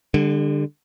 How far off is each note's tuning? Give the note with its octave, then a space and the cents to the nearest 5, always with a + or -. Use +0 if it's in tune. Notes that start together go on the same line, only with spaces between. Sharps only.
D3 +15 G3 +45